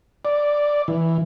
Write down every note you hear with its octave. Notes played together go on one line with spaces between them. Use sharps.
D5
E3